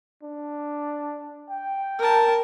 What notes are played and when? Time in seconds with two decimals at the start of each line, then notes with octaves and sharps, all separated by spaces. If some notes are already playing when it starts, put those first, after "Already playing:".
0.23 D4
1.49 G5
1.99 A#4 A5